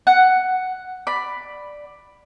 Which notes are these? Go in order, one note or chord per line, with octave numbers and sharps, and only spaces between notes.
F#5
D5 B5